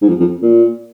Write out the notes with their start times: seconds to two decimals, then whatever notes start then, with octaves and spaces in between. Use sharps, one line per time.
0.02 G#2
0.08 F2
0.20 F2
0.42 A#2